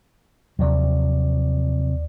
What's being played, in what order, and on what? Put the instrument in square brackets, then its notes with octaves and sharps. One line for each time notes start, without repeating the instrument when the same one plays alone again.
[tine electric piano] D#2 D5 [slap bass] C3 F3 F#3